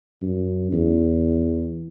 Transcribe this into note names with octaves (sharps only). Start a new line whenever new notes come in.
F#2
E2